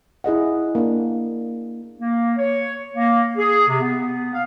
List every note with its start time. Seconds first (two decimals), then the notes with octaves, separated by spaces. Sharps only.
0.24 E4 G#4 D#5 F#5
0.75 A#3 D4
1.98 A#3
2.36 C#5
2.94 A#3
3.37 G#4
3.67 C3
3.80 B3
4.32 F5